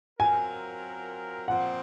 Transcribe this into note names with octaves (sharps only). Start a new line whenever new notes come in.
F#3 C4 F4 A#4 G#5
A#2 F3 C4 F#5